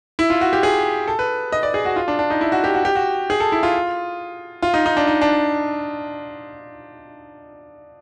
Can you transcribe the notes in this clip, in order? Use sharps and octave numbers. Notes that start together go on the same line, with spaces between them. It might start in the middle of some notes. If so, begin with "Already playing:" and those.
E4
F4
F#4
G4
G#4
A4
B4
D#5
D5
G#4
F#4
F4
D4
D4
D#4
E4
F#4
G4
F#4
G4
F#4
G#4
A4
E4
F4
F4
D#4
D#4
D4
D#4
D4